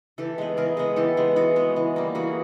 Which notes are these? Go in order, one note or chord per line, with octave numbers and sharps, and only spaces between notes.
E3 G4 A4
G#3 B3
E3 G#4 A#4
G#3 B3
E3 G4 A4
G#3 B3
E3 F#4 G#4
G#3 B3
E3
G3 A#3
E3 F#4 G#4